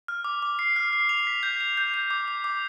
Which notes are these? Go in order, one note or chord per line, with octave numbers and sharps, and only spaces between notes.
F6
D6
D6
C7
F6
C7
F7
B6
G6
F7
G6
G6
D6
D6
D6